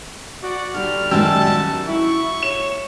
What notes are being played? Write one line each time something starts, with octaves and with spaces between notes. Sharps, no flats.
F#4 D5
D3 G3 F6
F#2 D#3 G#3 F#4 G5 A5 E6
F#4
E4 C#6
C#5 E7